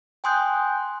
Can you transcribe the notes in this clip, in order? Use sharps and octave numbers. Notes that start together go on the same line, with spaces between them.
G5 G#5 C6 D#6 F#6 G6